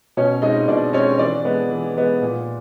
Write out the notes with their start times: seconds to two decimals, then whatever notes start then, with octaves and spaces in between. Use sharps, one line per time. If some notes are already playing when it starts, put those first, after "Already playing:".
0.17 B2 C#4 C#5
0.42 G#3 C4 D#4 D#5
0.68 B2 D4 D5
0.93 G#3 C4 C#4 C#5
1.19 E3 D4 D5
1.45 G#3 B3
1.71 E3
1.97 G#3 B3
2.22 A#2